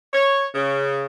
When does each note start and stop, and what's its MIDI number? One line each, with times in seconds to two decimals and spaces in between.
0.13 0.46 73
0.54 1.06 49